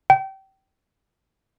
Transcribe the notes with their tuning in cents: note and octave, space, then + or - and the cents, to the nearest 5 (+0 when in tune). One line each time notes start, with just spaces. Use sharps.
G5 -25